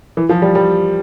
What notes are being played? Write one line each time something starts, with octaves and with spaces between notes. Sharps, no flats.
E3
F3
G3
G3